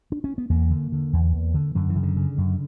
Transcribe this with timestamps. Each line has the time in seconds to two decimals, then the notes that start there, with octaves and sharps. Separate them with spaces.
0.12 D4
0.24 C#4
0.38 B3
0.50 E2 A#3
0.70 D3
0.92 D3
1.13 E2
1.33 E2
1.54 D3
1.75 F#2 D3
1.89 E3
1.96 C#3
2.03 D3
2.17 C#3
2.38 F#2